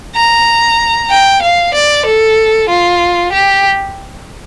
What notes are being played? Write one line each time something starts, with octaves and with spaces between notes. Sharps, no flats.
A#5
G5
F5
D5
A4
F4
G4